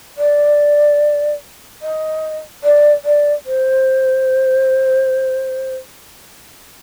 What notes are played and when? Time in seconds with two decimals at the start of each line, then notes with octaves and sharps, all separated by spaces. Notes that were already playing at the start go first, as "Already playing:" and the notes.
0.17 D5
1.82 D#5
2.63 D5
3.04 D5
3.46 C5